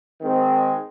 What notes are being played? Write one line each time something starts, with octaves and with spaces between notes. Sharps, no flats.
D#3 G#3 C4